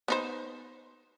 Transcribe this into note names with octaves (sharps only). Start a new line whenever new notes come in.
B3 D#4 C5